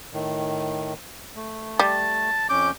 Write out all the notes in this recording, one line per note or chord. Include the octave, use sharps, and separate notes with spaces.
A2 D#3
A3
G3 A5
F2 C#4 D6 G6